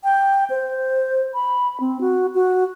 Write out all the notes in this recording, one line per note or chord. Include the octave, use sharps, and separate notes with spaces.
G5
C5
B5
C4
F#4
F#4